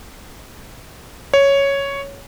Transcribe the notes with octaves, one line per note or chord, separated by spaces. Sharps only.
C#5